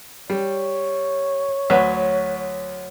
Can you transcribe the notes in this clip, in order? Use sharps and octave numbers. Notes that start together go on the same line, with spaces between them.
G3 C#5
D2 F#3 B4